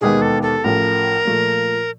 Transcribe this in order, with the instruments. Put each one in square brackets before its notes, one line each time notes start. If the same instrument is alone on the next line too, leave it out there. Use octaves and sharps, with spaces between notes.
[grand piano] E1 D#2 D#3 G#3 B3 [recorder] G#4
[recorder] A4
A4
[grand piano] A1 A2 F3 A3 [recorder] A#4
[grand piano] A#2 F3 A3